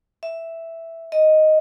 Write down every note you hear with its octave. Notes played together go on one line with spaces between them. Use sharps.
E5
D#5